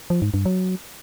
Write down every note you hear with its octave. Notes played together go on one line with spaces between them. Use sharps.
F3
G#2
G2
F#3